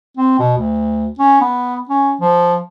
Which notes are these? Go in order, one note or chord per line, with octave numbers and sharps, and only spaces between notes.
C4
B2
D2
C#4
B3
C#4
F3